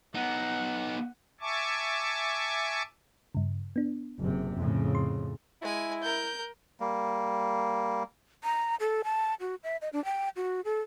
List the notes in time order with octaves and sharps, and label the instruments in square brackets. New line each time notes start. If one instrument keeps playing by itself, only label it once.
[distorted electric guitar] B3 D#4 [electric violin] F#5
[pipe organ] E5 G#5 A5 C#6 D6
[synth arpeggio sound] G2 C#3
B3 D4
[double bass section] F#1 C3
F2 A2 C#3
[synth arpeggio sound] C6
[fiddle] G#3 G#5 [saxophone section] E4
[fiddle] A#4 [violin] G6
[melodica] G3 A#3
[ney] A#5
A4
A5
F#4
E5
D#5
D4
G5
F#4
A4